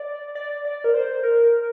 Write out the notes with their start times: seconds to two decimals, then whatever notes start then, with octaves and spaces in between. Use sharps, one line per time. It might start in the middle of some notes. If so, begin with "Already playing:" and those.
Already playing: D5
0.35 D5
0.65 D5
0.84 A#4
0.94 C5
1.23 A#4